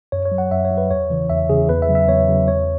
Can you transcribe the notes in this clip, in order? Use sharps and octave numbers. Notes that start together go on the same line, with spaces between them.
F#2 C#5
C#5
F#3
F#5
F#2 E5
C#5
F#3
B4
E2 C#5
C#3 E3
E2 E5
C#3 E3 G#4
E2 B4
E5
C#3 F#3
E5
E2 C#5
C#3 F#3
E2 C#5